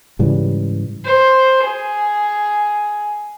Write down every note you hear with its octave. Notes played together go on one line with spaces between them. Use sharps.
G#2 C#3 E3 G3
C5
G#4